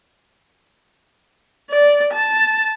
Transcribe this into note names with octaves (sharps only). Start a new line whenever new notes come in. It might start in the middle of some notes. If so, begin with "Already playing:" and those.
D5
A5